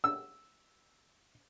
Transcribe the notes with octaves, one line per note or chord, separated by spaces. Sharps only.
E6